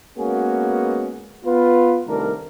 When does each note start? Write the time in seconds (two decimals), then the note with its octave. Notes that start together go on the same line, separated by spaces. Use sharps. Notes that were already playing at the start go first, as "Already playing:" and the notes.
0.17 G#3 A#3 B3 C#4 F#4 G#4
1.45 B3 F4 B4
2.07 C2 D#3 A3 D4 A#4